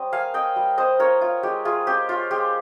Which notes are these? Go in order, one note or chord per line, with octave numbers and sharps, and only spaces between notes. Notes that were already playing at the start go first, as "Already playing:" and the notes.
Already playing: G3 C#4 C5 D#5
A#3 F5 G#5
D#5 G5
G3
C5 D#5
F4 A#4 C#5
F4
G#3 G4
F4 G#4
C#4 G4
F4
G#3 G4